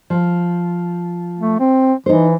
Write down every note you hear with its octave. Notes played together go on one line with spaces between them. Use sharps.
F3
A3
C4
E3 D#4 C5